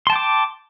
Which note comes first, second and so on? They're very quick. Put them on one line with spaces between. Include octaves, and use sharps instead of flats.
C6 A5 G5 D6